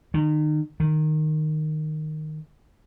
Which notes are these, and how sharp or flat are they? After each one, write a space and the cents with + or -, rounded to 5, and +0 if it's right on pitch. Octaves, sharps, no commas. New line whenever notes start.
D#3 -35
D#3 -15